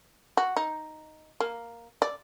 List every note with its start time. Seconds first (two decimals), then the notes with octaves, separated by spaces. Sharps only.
0.37 F#4
0.57 D#4
1.40 A#3
2.02 D5